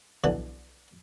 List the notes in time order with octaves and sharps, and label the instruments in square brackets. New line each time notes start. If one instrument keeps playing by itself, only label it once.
[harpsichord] B1 D3 E3 D4 A5